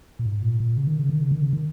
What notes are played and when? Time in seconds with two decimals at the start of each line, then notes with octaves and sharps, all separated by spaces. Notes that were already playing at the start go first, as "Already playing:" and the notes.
0.19 A#2
0.25 G#2
0.42 A#2
0.60 A#2
0.77 C#3
0.87 D#3
0.99 C#3
1.10 D#3
1.21 C#3
1.32 D#3
1.42 C#3
1.53 D#3